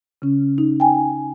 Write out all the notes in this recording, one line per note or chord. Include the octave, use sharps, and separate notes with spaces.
C#3 C#4
D#4
G5 G#5